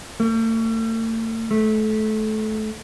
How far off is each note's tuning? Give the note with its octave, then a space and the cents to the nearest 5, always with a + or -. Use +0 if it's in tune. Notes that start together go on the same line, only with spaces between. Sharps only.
A3 +45
A3 -25